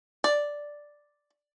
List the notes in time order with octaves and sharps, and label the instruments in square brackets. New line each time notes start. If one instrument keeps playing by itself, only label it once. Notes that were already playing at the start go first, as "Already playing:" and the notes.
[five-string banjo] D5